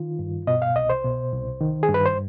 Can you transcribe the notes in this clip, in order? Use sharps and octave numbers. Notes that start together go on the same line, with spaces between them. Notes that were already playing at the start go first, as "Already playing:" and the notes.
Already playing: D#3 F4
G2
B2 D#5
F5
C2 D#5
C5
B2
C2
D#3
G#4
G2
B4
C5